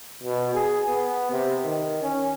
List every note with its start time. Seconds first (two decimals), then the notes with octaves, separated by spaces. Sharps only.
0.23 B2
0.54 G#4
0.87 B3
1.31 C3
1.64 D#3
2.02 C#4